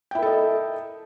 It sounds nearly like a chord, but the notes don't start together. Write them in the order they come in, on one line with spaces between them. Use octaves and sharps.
G5 E4 A#4 A4 D#5